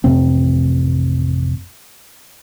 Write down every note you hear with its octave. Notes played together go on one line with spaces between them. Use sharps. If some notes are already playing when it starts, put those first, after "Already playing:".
A1 F2 C3 C4